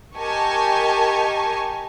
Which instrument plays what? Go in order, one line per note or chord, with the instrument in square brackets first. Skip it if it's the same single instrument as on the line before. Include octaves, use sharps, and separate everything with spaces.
[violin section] G4 A#4 D#5 G#5 A5 C#6